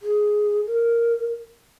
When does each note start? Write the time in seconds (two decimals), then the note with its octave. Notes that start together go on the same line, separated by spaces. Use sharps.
0.02 G#4
0.67 A#4